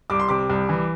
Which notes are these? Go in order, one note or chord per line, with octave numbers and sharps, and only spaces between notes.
C2 D6
C6
C3 D6
C2
E3